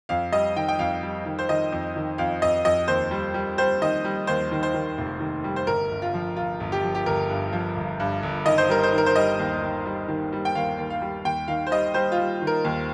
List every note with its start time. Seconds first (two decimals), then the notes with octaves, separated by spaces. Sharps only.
0.09 F2 F5
0.32 G3 D#5
0.56 D#3 G5
0.68 G5
0.79 F2 F5
1.03 G3
1.26 D#3
1.39 C5
1.49 D#3 D#5
1.72 F2
1.96 D#3
2.18 F2 F5
2.42 F2 D#5
2.65 F2 D#5
2.88 D#2 C5
3.11 G3
3.34 G3
3.58 G3 C5
3.81 D#3 D#5
4.04 G3
4.27 D#2 C5
4.52 D#3
4.63 C5
4.74 D#3
4.98 F1
5.20 D#3
5.44 G3
5.56 C5
5.67 G1 A#4
5.91 G1
6.02 F4
6.14 F3
6.36 G1 F4
6.60 G1
6.72 G4
6.83 F3
6.95 G4
7.06 G1 A#4
7.30 G2
7.53 F3
7.76 G1
8.00 G2
8.23 G1
8.46 D#3 D#5
8.58 C5
8.69 G3 A#4
8.83 C5
8.93 D#3
8.98 A#4
9.06 C5
9.16 G3 D#5
9.39 D#2
9.62 D#3
9.86 G3
10.08 D#3
10.33 G3
10.45 G5
10.55 D#2 F5
10.78 D#2
10.90 F5
11.02 G3
11.25 D#2 G5
11.48 D#3 F5
11.67 C5
11.71 G3 D#5
11.94 G3 C5
12.12 F4
12.18 G3
12.41 D#3
12.47 A#4
12.64 D#2